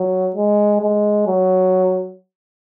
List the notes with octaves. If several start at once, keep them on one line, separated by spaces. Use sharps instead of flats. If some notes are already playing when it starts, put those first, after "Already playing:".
Already playing: F#3
G#3
G#3
F#3